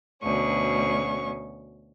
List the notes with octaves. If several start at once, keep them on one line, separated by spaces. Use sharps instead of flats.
D2 B2 C#4 C#6